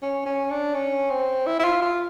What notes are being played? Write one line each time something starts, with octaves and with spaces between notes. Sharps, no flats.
C#4
C#4
D4
C#4
C4
E4
E4
F4
F4